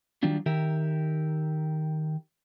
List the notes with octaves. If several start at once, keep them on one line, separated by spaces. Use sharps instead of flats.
D#3 F#3 G3 D4 F4
D#3 G4 A#4 E5